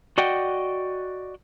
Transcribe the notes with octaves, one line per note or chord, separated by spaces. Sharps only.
F#4 D5 D#5 F#5 G5